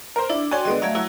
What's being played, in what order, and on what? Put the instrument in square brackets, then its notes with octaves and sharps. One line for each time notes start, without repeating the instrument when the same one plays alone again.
[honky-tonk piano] A#4 C5
[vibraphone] D4 [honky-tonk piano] E4 D5
[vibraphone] F#4 G5 C6 [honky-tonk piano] C#5 D5 G#5
[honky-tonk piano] D3 G#3 B3 [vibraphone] D5 D#5
[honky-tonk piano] F#3 G#6 [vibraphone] A3 E5 F5
[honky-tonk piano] F#3 [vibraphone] E4